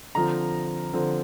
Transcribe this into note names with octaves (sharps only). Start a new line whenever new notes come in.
D3 F3 C4 A#5
D3 F3 C4